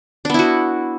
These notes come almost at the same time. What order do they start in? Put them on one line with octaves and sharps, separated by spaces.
D4 B3 E4 F#4